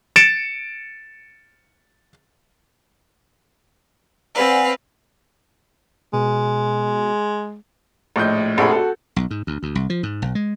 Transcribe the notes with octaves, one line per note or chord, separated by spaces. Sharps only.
A6 C#7 D7 E7
C4 B4 D5 F5 F#5 G#5
B2 G#3
A#1 A2 D#5 G6
F1 A#1 G#4 A4 F#5 B5
F#4 A4
B1
G#2
D2
D2
C2
F3
G#2
B1
G#3